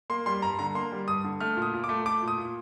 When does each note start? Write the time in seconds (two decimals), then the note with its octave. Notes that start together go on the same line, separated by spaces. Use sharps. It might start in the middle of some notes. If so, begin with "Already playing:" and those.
0.10 A#3 C6
0.26 G3 C6
0.42 G2 A#5
0.59 D3 A#5
0.75 A#3 C6
0.92 G3
1.08 G2 D#6
1.24 D3
1.40 A3 F6
1.57 A#2
1.62 D#6
1.73 A#2
1.84 D6
1.89 A3
2.06 A3 D6
2.22 A#2
2.28 D#6
2.38 A#2